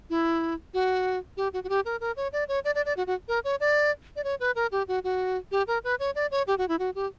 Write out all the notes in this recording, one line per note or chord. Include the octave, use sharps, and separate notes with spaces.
E4
F#4
G4
F#4
F#4
G4
A#4
A#4
C#5
D5
C#5
D5
D5
D5
F#4
F#4
A#4
C#5
D5
D5
C#5
B4
A#4
G4
F#4
F#4
G4
A#4
B4
C#5
D5
C#5
G4
F#4
E4
F#4
G4